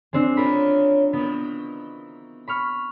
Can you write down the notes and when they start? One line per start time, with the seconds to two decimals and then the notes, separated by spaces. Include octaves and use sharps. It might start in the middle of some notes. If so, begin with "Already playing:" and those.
0.13 G#3 C4 D4
0.37 C#3 G#3 C#4 F4 A#4 B5
1.13 D#3 E3 B3
2.48 B5 C#6 F6